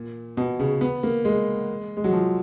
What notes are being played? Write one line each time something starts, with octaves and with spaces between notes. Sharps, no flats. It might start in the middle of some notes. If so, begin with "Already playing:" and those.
Already playing: A#2
B2
C#3
B3
A#3
G#3
G#3
F#3
F3